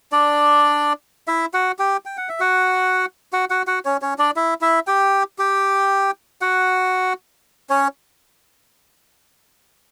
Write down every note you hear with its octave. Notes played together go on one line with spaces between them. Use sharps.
D4 D5
E4 E5
F#4 F#5
G4 G5
G5
F#5
E5
F#4 F#5
F#4 F#5
F#4 F#5
F#4 F#5
C#4 C#5
C#4 C#5
D4 D5
E4 E5
E4 E5
G4 G5
G4 G5
F#4 F#5
C#4 C#5